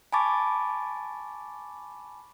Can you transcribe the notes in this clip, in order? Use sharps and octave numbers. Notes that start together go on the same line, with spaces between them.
G#5 A5 B5 C#6 D6 A6